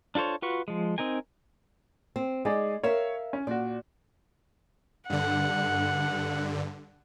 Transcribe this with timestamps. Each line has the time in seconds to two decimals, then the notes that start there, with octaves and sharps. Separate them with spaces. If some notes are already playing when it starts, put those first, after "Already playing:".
0.15 D4 F4 A4 C5 C#5
0.42 F4 F#4 B4 C#6
0.68 F3 G#3
0.98 C4 D#4 A#4 G#5
2.16 C4
2.45 G#3 D#4 G#4 D5
2.83 A#4 C#5 E5 F5
3.33 C#4
3.47 A#2 F#4 D5
5.10 G2 D3 F#5